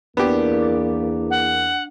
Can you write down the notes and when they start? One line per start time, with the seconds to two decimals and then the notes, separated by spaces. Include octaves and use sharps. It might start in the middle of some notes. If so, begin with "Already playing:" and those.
0.17 E2 A#3 B3 D4 G4
0.60 D6 A6
1.30 F#5